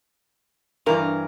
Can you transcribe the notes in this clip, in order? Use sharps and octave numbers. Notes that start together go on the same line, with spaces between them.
G2 E3 A#4